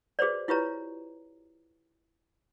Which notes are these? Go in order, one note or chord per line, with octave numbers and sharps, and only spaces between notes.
F#4 G#4 B4 C5 D5
E4 F4 G4 B4 C#5 A#5